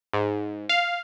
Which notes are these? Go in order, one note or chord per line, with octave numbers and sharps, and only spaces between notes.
G#2
F5